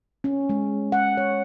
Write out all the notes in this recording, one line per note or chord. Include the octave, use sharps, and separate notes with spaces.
C#4
G#3
F#5
C#5